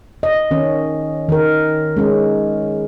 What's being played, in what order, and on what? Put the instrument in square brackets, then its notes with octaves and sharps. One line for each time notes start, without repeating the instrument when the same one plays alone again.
[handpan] D#5
D#3 C#4
D#3 A#4
G#3 C#4